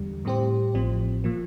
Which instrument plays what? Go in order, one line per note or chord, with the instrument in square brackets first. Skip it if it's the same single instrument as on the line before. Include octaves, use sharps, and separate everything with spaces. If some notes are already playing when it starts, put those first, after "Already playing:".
Already playing: [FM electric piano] E2 D3 G3
A2 G3 C4 G4 C5
A1 A2 F3 C4
A#2 F3 A#3